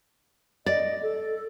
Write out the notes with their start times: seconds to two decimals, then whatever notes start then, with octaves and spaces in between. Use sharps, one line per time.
0.66 D5 D#5
1.02 A4